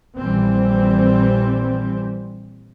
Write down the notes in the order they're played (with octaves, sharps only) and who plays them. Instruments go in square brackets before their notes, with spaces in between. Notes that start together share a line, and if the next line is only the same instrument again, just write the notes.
[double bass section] A#1 E3 G3 C4